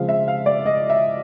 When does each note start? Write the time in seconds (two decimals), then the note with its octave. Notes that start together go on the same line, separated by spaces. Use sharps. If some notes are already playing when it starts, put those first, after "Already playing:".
Already playing: C#3 F3 G#3 C4 F5
0.09 E5
0.28 F5
0.46 D5
0.66 D#5
0.90 E5